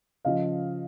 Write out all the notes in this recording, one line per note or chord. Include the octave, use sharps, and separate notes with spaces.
C#3 F3 D#5 F5